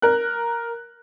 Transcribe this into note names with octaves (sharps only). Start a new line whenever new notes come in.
A#4 F#6